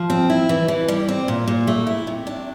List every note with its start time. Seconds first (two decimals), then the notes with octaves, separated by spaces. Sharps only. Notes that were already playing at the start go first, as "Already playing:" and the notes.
Already playing: F3
0.10 C4
0.30 E4
0.49 E3
0.68 E3
0.88 G3
1.09 C4
1.28 A#2
1.48 A#2
1.67 A3
1.87 E4
2.07 C3
2.27 D4